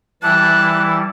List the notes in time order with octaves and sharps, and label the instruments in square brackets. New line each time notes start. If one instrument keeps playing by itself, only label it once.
[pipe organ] E3 G3 E4 [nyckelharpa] A5 [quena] F#6